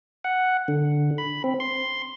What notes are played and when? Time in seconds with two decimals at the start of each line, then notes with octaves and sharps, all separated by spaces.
0.24 F#5
0.68 D3
1.18 B5
1.44 C4
1.60 C6